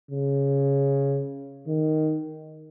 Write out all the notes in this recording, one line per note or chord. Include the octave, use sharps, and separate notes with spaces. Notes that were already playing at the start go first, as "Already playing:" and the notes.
C#3
D#3